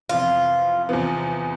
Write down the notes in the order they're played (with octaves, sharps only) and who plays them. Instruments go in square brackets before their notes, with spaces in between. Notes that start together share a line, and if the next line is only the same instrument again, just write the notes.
[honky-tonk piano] F2 C3 E3 B3 [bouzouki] F4
[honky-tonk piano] E2 C3 F3 B3